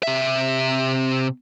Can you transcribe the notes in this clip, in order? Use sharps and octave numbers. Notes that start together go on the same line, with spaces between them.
C3 E5